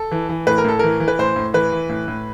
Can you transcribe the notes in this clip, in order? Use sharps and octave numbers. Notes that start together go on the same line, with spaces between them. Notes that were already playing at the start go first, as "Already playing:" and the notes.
Already playing: A4
E3
E3
A2 B4
A#4
A2 A4
E3 A#4
E3
B4
A2 C5
A2
E3 B4
E3
A2
A2